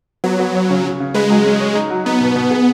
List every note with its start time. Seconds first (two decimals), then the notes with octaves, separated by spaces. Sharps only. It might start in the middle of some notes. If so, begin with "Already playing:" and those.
0.24 F#3 B3
0.39 B3
0.55 C#5
0.70 C#3
0.84 C#3
1.00 C#3
1.14 G#3 B4
1.30 F#3
1.45 C#4
1.60 C#5
1.75 D#4
1.90 F#3
2.05 B3 D#4
2.21 B2
2.36 B2
2.51 G#4